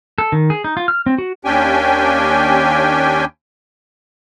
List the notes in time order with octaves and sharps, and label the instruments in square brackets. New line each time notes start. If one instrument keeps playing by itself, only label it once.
[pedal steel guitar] A4
D#3
G#4
D#4
F4
F6
C4
F#4
[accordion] D#2 C#4 D4 G4 G5 G#5